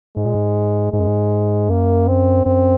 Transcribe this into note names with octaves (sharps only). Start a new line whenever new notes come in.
G#2 G#3
A#2
G#2
G#2 G#3
F#2
G#2
F#2 A#3
C4
F#2 C4